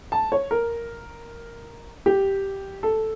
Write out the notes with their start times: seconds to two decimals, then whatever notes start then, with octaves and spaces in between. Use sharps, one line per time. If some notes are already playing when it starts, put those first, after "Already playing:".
0.12 A5
0.32 C#5
0.51 A#4
2.06 G4
2.83 A4